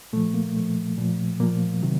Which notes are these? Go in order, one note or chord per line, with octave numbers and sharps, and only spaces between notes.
A#2 F3 A3
A#3
A#2 F3 A3
A#2 F3
A#2 F3 A#3
C3 D#3 F#3